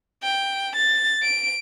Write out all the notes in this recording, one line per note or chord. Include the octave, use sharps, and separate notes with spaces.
G5
A6
D7